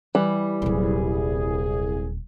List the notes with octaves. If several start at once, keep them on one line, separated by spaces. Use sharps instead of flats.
E3 G3
D#1 C2 F#3 G#4